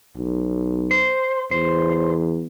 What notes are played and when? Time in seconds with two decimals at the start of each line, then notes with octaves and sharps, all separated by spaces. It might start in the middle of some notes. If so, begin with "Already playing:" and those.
0.17 B1
0.91 C5
1.51 E2 C5